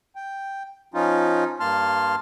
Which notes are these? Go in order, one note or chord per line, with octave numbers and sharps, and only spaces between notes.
G5
F3 C#4 D#4 F4
G2 A#3 A5 C6 F6